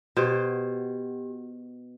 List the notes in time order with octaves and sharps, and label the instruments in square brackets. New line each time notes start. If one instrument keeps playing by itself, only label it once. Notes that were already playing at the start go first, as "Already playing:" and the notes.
[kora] B2 C5 [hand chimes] F#4 G4